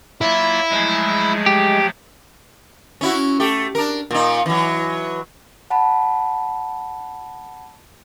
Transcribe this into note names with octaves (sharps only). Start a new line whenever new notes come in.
F#3 A#3 E4 F4
F3 F#3 G#3 A3
G4
C#4 E4 F#4
A3 G4
D4 A#4
A#2 D#4
E3 F#3
F#5 A5 B5